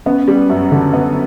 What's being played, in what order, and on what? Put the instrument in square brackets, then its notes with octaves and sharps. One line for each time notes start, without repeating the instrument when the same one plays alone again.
[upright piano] B3 [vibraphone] C#4
[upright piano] G3
F#2
D3
B3